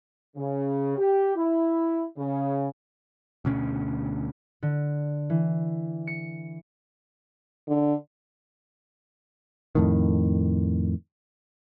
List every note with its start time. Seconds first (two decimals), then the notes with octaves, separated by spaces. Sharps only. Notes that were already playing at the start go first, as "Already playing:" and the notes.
0.36 C#3
0.97 G4
1.36 E4
2.18 C#3
3.45 D2 B2 C#4
4.63 D3
5.30 E3
6.07 C#7
7.68 D3
9.75 F2 A2 D#3